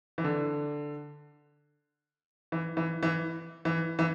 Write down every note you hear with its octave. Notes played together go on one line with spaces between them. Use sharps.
E3
D3
E3
E3
E3
E3
E3